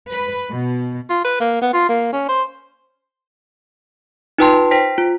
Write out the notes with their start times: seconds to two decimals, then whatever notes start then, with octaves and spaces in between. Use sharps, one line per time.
0.11 B4
0.51 B2
1.10 F4
1.24 B4
1.40 A#3
1.62 B3
1.73 F4
1.89 A#3
2.12 C#4
2.29 C5
4.38 D#4 F4 B4 G5 A5 C6
4.71 C5 G5 A#6 B6
4.98 F4